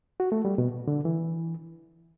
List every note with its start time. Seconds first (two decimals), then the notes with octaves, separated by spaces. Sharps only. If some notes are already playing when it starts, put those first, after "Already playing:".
0.20 F#4
0.32 A3
0.45 G3
0.58 B2
0.88 D3
1.05 E3